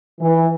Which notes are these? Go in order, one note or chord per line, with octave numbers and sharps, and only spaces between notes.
E3